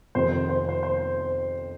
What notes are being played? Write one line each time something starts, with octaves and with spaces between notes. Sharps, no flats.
F2 C3 D#3 C5
C5
C5
C5